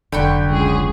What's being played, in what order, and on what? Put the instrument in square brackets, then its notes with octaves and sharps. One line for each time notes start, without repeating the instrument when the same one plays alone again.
[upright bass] F1 F#3 [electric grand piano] D3 [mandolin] G5 B5 C#6
[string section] C#2 G#4